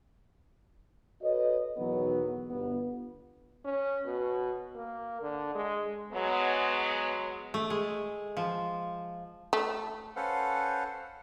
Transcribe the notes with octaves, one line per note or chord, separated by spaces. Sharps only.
F#4 A4 B4 C#5 D#5
B1 E2 B2 D#3 F#3 B3
G1 B3
C#4
B2
A#3
D3
G#3
F#3 G#3 B3
A3
G#3
F3
A3
C#4 A4 B4 C5 F5 F#5